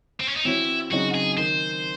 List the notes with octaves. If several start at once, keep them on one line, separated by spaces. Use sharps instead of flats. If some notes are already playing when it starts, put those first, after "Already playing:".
C4
C#4
D#4
E3 C4 E4 F#4 C#5
C#3 F#3 C4 D#4 F#4
G#4
D#3 C5